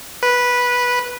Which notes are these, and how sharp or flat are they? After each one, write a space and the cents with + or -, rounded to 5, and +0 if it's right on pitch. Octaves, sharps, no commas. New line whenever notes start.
B4 -10